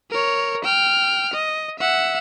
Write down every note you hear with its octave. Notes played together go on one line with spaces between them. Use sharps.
A#4 C#5
G5 F6
D#5
E5 F#5